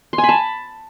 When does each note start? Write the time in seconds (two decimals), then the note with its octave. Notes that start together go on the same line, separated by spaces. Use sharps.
0.13 C6
0.18 G#5
0.23 B5
0.29 A5